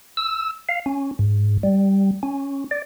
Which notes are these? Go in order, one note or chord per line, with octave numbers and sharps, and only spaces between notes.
E6
F5
C#4
G#2
G3
C#4
D5